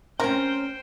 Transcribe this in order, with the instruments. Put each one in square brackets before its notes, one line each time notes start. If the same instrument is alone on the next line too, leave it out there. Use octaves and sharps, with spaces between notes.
[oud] C4 C#4 [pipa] A#4 [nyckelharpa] C5 G5